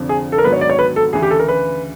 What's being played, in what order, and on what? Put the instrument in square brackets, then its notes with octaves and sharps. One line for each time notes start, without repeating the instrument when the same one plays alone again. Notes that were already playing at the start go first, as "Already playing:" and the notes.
Already playing: [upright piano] F1 F2 D3 F3
[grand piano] G#4
A4
A#4
[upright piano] G#2 D#3 F#3 B3 D4 [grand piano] B4
[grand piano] C#5
D5
C#5
B4
A4
[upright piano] D2 C#3 E3 [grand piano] G#4
[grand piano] G4
A4
A#4
B4